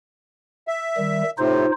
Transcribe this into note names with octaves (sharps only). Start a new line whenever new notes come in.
E5
D#3 G3
A2 C3 D#4 F4 C5